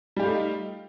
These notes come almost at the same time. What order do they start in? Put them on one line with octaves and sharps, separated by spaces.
G3 G4 F4 A3 D#4